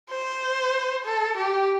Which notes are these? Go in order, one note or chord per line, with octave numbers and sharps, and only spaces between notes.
C5
A4
G4